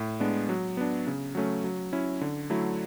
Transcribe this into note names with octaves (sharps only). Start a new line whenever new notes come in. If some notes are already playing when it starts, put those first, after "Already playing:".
Already playing: A2
G#3 B3 D4
F#3
B3 D4
C#3
F#3 A3 C#4
F#3
C#4 E4
D3
F#3 A3 E4